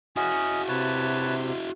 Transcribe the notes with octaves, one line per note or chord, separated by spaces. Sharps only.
C#4 E4 F#4 D#5
C3 B4 C#5 A5